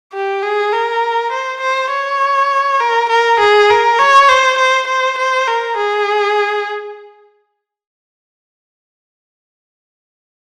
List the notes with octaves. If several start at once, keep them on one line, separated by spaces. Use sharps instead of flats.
G4
G#4
A#4
C5
C5
C#5
A#4
A#4
G#4
A#4
C#5
C5
C5
C5
C5
A#4
G#4